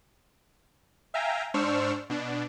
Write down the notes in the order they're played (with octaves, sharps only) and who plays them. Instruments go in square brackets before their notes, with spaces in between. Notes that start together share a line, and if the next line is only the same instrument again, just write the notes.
[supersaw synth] E5 F5 G5 G#5 A#5
G#2 D4 C5 C#6 E6 F6
B2 D4